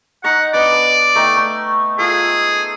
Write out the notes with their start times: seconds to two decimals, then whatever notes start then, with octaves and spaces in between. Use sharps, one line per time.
0.24 D#4 F#5 A#5 C#6
0.54 B3 D4 D5 D#5
0.72 A5 D6
1.15 A3 D#4 G5
1.37 A3
1.99 F4 G#4 A4